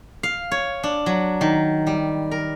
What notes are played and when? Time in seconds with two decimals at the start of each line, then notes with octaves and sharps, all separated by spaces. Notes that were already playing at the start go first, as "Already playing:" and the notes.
0.23 F5
0.51 C#5
0.83 D4
1.06 F#3
1.41 D#3
1.87 G3
2.31 A#4